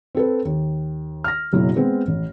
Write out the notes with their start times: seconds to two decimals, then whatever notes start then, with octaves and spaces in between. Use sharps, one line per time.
0.15 C4 A4 B4
0.45 D#2
1.24 F6 A#6
1.53 F#1 B2 F#3 E4
1.76 G#3 B3 C4 G#4
2.07 A1